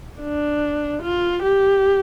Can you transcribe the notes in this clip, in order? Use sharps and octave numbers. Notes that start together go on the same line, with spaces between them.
D4
F4
G4